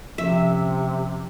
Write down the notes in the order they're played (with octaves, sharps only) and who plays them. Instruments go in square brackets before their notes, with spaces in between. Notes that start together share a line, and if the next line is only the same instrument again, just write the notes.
[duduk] C3 [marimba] F3 C#4 [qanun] E5